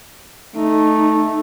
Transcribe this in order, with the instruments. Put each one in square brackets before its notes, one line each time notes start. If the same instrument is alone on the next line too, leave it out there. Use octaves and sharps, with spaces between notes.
[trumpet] A3 [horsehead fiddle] D#4